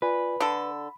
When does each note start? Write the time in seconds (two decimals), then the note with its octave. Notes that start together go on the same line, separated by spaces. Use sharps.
0.02 F4 B4 D5 G#5
0.40 D3 A4 B5